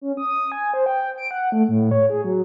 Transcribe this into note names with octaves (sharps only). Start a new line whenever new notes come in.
C#4
D#6
G#5
C5
G5
D7
F#5
A3
A2
C#5
G#4
F#3